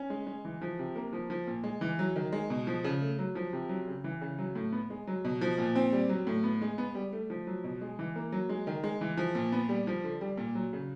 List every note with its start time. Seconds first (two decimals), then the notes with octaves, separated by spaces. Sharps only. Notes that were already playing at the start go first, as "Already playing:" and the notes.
Already playing: C#4
0.10 G#3
0.27 G#3
0.45 E3
0.62 F3
0.79 C3
0.96 A#3
1.13 F3
1.30 F3
1.47 A#2
1.64 G#3
1.81 E3
1.99 F#3
2.16 D#3
2.32 G#3
2.50 B2
2.67 F3
2.84 C#3
3.01 A3
3.19 F#3
3.35 F3
3.53 C3
3.69 F#3
3.88 C#3
4.04 E3
4.21 C#3
4.38 F#3
4.55 A2
4.72 B3
4.90 G#3
5.07 F#3
5.25 B2
5.41 F3
5.58 A#2
5.76 C4
5.92 G3
6.09 F#3
6.27 A2
6.43 B3
6.62 G#3
6.78 B3
6.95 G3
7.13 A3
7.30 F3
7.47 F#3
7.64 B2
7.81 G#3
7.99 E3
8.16 A#3
8.32 F#3
8.49 G#3
8.67 D#3
8.84 G#3
9.01 E3
9.17 F3
9.35 A#2
9.52 B3
9.69 G3
9.87 F3
10.04 D3
10.21 G3
10.38 A#2
10.55 F#3
10.73 C#3